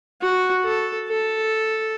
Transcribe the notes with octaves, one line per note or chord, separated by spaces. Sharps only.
F#4
A4
A4